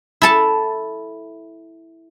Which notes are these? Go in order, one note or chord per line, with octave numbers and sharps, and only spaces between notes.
E4 A4 A5